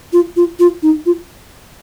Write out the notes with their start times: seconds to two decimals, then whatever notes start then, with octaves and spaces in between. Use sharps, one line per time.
0.13 F4
0.36 F4
0.60 F4
0.83 D#4
1.06 F4